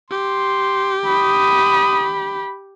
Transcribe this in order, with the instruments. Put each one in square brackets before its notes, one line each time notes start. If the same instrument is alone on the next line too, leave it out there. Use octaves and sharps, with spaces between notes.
[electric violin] G4 [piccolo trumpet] C6
[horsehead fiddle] B5 [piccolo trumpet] D#6